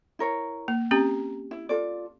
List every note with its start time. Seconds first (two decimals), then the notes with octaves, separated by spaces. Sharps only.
0.19 E4 A#4 C#5
0.68 A#3
0.91 C4 C#4 G4 A#5
1.51 E4
1.69 F4 A4 D5